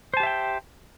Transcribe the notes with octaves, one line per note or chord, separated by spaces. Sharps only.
G4 C5 E5 G5 A5